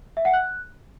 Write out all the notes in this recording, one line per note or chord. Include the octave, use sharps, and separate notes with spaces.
E5
F#5
F#6